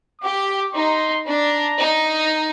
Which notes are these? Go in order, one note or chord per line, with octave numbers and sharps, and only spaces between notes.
G4 D6
D#4 C6
D4 A#5
D#4